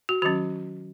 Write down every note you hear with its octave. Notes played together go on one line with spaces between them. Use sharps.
F#4
D#3 F#3 C#4 F#4